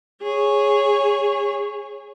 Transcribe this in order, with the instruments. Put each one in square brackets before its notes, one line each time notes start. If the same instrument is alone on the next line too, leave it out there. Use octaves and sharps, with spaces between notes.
[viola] G#4 C#5